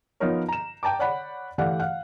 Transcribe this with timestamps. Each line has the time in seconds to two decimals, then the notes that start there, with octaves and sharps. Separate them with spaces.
0.20 F3 B3 D#4 F4 A#4 C#5
0.49 A#5 E7
0.83 G5 A5 A#5 D6
0.99 C#5 D5 F#5 B5
1.58 E3 A3 G4 D5 F5 F#5
1.80 F5 F#5 F#6